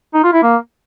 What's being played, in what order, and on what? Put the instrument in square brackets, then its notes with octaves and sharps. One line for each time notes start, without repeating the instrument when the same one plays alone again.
[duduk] D#4
F4
E4
A#3